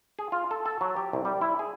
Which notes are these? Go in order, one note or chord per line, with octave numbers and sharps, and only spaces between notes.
G#4
F4
A4
A4
F#3
G4
C2
G3
E4
G#4